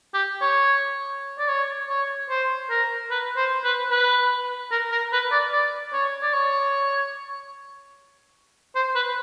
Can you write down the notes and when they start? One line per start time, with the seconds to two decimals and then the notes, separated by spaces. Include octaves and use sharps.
0.14 G4
0.41 C#5
1.39 D5
1.49 C#5
1.89 C#5
2.30 C5
2.70 A#4
3.10 B4
3.37 C5
3.64 B4
3.91 B4
4.71 A#4
4.91 A#4
5.12 B4
5.32 D5
5.53 D5
5.93 C#5
6.23 D5
6.33 C#5
8.75 C5
8.95 B4